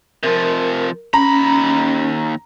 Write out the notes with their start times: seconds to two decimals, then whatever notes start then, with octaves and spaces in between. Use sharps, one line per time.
0.23 C3 F3 A#4
1.14 D#2 C#4 A#5 B5